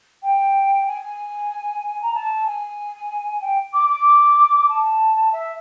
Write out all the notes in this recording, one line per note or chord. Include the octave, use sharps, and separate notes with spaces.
G5
G#5
A#5
A5
G#5
G5
D6
D6
A5
E5